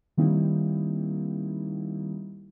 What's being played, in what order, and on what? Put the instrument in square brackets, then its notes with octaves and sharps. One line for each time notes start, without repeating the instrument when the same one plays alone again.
[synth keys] D#3 G3 A#3 C4 D#4 E4